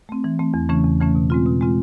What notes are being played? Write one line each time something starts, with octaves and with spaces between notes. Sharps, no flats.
A3 C4
E3
A3 C4
E2
C#3 E3 A3 C#4
E2
C#3 E3 A3 C#4
B2
G#3 C4 F4
B2
G#3 C4 F4